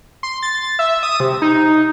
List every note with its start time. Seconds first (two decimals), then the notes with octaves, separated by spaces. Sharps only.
0.23 C6
0.43 A6
0.79 E5
1.03 D#6
1.20 C3
1.42 D#4